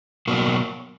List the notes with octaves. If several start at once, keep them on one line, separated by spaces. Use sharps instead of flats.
B2 F#3 A#3